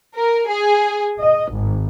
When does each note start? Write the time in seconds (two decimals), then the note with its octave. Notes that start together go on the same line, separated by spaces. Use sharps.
0.15 A#4
0.48 G#4
1.19 D#5
1.51 G#1